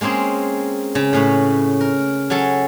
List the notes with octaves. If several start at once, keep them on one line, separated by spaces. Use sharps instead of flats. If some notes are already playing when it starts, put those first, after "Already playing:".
G#3 A#3 C4 C#4 G#4
C#3
A2 C#4 B4
A#4
F#3 C#4 A4